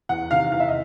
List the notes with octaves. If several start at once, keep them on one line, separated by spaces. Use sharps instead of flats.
E2 F#5
C3 D#3 F5
E2 F5
E5
D#5